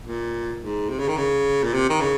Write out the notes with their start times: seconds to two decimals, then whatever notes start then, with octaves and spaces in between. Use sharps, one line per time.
0.05 A#2
0.61 G#2
0.89 C3
0.99 C#3
1.08 D#3
1.17 C#3
1.64 A#2
1.74 C3
1.90 D#3
2.01 C#3